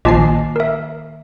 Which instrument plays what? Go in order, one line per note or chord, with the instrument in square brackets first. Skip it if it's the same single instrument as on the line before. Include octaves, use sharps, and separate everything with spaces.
[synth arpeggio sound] A#1 A5 C7 [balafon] D#3 A#3 D6 [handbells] F4 D#5
[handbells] A#4 E5